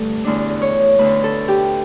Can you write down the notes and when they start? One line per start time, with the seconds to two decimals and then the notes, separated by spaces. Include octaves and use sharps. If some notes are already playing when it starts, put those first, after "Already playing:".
Already playing: G2 D3 A3 A4
0.24 E2 D3 A3 D4
0.62 C#5
0.99 D2 D3 A3 B4
1.24 A4
1.48 G4